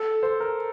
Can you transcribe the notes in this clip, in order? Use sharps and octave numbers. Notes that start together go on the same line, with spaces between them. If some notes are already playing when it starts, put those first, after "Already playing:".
Already playing: A4
C5
A#4